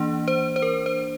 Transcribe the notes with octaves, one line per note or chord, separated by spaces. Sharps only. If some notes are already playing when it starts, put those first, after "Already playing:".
Already playing: E3 A#3 D4
C5
C5
A#4
C5